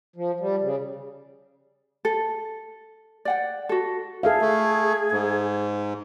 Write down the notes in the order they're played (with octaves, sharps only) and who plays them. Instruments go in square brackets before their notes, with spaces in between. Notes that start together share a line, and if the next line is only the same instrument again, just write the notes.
[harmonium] F3
G3
C#3
[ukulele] A4
D5 F#5 G5
F#4 A4
[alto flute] G#4 [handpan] A4 E5 F5
[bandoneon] A3
G#2